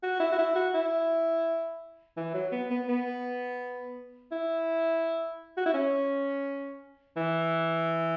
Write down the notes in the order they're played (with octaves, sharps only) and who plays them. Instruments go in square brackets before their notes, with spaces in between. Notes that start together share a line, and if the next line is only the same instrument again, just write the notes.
[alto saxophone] F#4
E4
F#4
E4
F#4
E4
E3
F#3
B3
B3
B3
E4
F#4
E4
C#4
E3